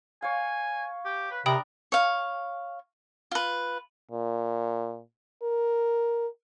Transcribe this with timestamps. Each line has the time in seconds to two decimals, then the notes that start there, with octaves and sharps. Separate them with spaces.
0.22 C#5 F5 G#5
1.05 G4
1.31 B4
1.46 C3 D4 A#4 G5 B5 D#6
1.92 C#5 F5
3.31 F4 B4
4.11 A#2
5.43 A#4